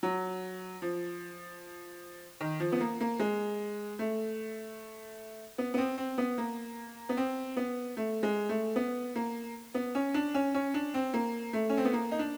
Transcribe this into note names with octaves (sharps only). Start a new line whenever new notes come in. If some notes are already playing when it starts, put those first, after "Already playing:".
F#3
F3
D#3
F3
B3
A#3
A#3
G#3
A3
B3
B3
C4
C4
B3
A#3
B3
C4
B3
A3
G#3
A3
B3
A#3
B3
C#4
D4
C#4
C#4
D4
C4
A#3
A3
C#4
C4
B3
A#3
D#4
D4